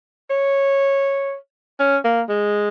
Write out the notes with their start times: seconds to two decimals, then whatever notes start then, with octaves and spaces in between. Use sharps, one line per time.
0.30 C#5
1.79 C#4
2.05 A#3
2.29 G#3